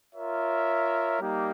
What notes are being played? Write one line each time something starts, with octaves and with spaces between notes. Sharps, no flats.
F4 A#4 C#5 E5
G3 A#3 D#4 G4